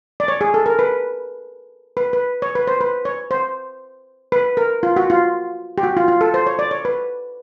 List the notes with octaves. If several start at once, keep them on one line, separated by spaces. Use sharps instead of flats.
D5
C#5
G#4
A4
A#4
B4
B4
B4
C#5
B4
C5
B4
C#5
C5
B4
A#4
F4
F#4
F4
G4
F#4
F4
F4
A4
C5
C#5
D5
C#5
B4